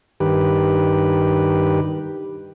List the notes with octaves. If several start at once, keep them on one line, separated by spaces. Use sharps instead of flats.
G2 D#3 G4 B4